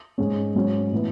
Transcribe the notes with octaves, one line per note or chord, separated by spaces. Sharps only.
G#2 G#3 C#4
G#2 F#3 C#4
A2 E3 B3 E4